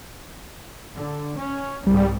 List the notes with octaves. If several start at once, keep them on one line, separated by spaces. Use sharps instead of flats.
D3
C#4
C2 G#2 G3